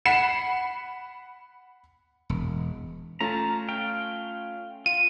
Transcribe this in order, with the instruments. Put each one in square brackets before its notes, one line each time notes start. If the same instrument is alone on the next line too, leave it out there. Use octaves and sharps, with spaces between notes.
[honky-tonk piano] F#5 B5 B6 C7 E7
[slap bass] E1
[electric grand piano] A3 C#4 F4 [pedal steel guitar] A5 A#5
[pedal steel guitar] F5 G5
[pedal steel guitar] F4 [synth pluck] D#7